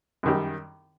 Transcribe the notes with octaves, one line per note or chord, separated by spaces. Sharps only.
F#2 D#3 G3